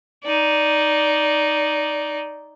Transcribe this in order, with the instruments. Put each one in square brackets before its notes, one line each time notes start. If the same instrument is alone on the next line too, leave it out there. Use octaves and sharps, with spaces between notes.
[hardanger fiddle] D#4 D5